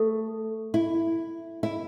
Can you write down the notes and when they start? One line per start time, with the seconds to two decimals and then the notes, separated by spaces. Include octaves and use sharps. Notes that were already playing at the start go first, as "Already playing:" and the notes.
Already playing: A3 A4
0.74 E4
1.63 E4